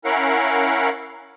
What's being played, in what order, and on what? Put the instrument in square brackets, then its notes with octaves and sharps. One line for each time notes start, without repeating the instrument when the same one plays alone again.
[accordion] C#4 E4 A#4 F5 F#5